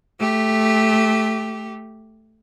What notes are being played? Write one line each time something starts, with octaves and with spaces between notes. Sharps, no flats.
A3 G4